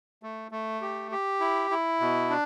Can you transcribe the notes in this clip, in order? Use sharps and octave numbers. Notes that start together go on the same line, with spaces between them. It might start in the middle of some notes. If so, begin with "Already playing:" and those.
A3
A3
G4
G4
E4
E4
B2
D4